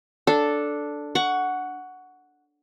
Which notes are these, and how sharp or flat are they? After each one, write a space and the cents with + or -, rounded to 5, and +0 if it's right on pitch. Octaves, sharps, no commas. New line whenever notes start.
D4 +0 A4 +0
F#5 +0 C#6 +20